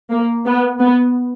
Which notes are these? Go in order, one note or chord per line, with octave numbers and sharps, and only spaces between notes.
A#3
B3
B3